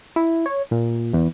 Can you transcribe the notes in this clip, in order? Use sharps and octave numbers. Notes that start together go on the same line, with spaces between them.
E4
C#5
A#2
E2